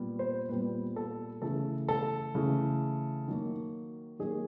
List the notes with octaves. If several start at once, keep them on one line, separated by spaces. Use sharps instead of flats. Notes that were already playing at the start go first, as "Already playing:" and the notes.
Already playing: A#2 G3 B3
C5
A#2 G3 B3 B4
A4
C#3 E3 A3 A4
A4
C#3 E3 A3
D#3 F#3 A#3
D#3 F#3 A#3 G#4